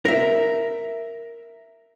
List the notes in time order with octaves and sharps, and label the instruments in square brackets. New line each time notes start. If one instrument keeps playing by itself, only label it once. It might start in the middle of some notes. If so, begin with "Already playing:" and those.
[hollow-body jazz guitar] A#4 E5